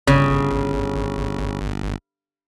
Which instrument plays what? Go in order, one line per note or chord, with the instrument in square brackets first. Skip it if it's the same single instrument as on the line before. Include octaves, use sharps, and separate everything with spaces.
[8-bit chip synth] G1 [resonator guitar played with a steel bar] C#3